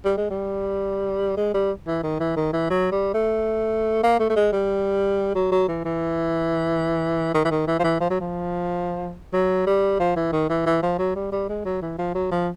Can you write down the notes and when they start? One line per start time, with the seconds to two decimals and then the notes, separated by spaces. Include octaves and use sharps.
0.05 G3
0.17 G#3
0.30 G3
1.37 G#3
1.54 G3
1.87 E3
2.03 D#3
2.20 E3
2.36 D#3
2.53 E3
2.70 F#3
2.92 G3
3.14 A3
4.03 A#3
4.19 A3
4.30 A3
4.36 G#3
4.52 G3
5.35 F#3
5.52 F#3
5.68 E3
5.85 E3
7.34 D#3
7.44 E3
7.51 D#3
7.67 E3
7.79 F3
7.84 E3
8.00 F3
8.10 F#3
8.20 F3
9.33 F#3
9.66 G3
9.99 F3
10.16 E3
10.32 D#3
10.49 E3
10.66 E3
10.82 F3
10.99 F#3
11.15 G3
11.32 G3
11.49 G#3
11.65 F#3
11.82 E3
11.98 F3
12.15 F#3
12.31 F3